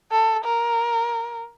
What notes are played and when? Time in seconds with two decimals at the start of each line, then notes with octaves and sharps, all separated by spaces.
0.12 A4
0.45 A#4